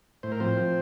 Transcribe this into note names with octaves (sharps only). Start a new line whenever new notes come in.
A2 C5
A#4
F3 C4 C5
F3